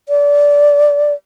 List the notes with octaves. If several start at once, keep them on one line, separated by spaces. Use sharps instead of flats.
D5